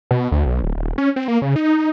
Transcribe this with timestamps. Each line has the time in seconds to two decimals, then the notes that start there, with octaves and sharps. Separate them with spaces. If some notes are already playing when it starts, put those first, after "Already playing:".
0.11 B2
0.32 D2
0.46 B1
0.63 D1
0.77 D#1
0.98 C#4
1.16 C4
1.28 A#3
1.42 C#3
1.56 D#4